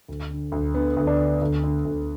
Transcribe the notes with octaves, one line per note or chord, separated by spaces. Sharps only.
D2
D3
D2
D3 B3
D2
D4
D3
D2
D3
D2